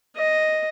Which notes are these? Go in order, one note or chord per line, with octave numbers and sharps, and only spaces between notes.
D#5